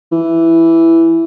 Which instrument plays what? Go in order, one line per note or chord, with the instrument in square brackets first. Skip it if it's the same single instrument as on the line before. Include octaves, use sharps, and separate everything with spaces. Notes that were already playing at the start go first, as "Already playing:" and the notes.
[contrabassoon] E3